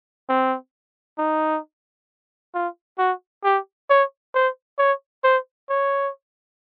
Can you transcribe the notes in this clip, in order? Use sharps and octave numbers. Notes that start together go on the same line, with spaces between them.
C4
D#4
F4
F#4
G4
C#5
C5
C#5
C5
C#5